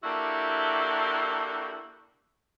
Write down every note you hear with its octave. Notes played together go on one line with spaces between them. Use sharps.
A#3 D4 E4 F#4 G4 A4